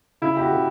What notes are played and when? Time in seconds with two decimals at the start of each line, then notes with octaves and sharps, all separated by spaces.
0.22 C#3 E4
0.37 G4
0.43 F#4
0.52 C#3